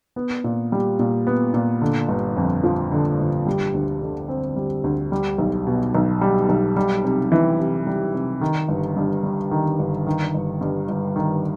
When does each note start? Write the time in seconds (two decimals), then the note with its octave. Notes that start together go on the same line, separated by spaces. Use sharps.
0.16 B3
0.44 A#2
0.72 G3
0.99 A#2
1.27 B3
1.54 A#2
1.82 D3
2.08 G1
2.37 F2
2.64 F3
2.92 D3
3.19 G1
3.47 G3
3.74 D2
4.02 D3
4.29 C4
4.56 G3
4.84 D2
5.12 G3
5.38 B1
5.67 B2
5.95 B1
6.21 G3
6.49 B1
6.76 G3
7.04 C3
7.32 E3
7.59 C3
7.87 G3
8.14 C3
8.41 D#3
8.68 G1
8.96 G2
9.23 G3
9.51 D#3
9.79 G1
10.07 D#3
10.34 G1
10.61 G2
10.89 G1
11.16 D#3